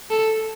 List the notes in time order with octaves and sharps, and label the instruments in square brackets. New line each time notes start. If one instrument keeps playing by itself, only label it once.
[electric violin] A4